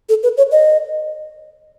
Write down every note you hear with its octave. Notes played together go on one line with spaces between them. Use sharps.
A4
B4
C#5
D#5